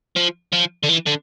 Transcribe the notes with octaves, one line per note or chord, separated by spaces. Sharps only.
F3
F3
D3
E3
D3